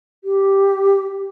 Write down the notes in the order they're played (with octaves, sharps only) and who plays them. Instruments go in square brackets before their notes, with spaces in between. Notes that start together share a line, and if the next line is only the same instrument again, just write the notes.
[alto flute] G4